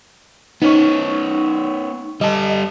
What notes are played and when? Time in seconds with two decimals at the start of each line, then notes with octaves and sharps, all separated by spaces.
0.62 B3 C#4 D#4 C#6
2.21 G3 A4 D#5